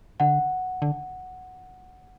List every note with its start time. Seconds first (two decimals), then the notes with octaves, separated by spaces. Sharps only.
0.20 D3 F#5
0.82 D3